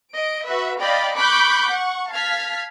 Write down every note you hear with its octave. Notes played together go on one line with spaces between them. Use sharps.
D#5 D7
F#4 B4 E5
D5 D#5 F5 G5 B5
B5 C#6 D6 F#6 G6 B6
F#5 C#6
F5 A5 F6 G#6 B6